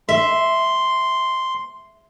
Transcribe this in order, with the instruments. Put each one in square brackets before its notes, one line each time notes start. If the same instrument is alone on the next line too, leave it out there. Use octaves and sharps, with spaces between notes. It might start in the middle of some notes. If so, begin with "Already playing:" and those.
[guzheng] E5 [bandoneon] C6